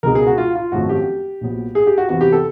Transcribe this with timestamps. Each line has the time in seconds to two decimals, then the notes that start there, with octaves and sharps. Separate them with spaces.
0.03 C#2 B2 G#3 B3 A#4
0.15 G#4
0.27 F#4
0.38 F4
0.55 F4
0.72 G#1 F#2 C#3 F3 A3 F#4
0.89 G4
1.41 A#1 A#2 F#3 B3
1.75 G#4
1.87 G4
1.98 F#4
2.09 E2 C3 E3 F#4
2.21 G4
2.32 A4